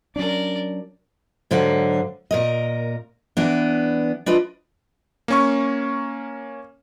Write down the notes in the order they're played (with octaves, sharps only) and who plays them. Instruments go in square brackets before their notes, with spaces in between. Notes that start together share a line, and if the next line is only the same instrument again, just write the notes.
[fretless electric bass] F#3 C#4 D4 [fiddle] A#4 D5
[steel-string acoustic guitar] G#2 D3 F#3 F5 F#5
A#2 A#4 D#5
E3 B3 D4
D4 F4 B4 D#5
[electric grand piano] A#3 C#4 C#6